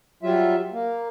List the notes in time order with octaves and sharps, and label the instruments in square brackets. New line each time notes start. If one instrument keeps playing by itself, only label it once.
[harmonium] F#3 G3 F4 E5
A#3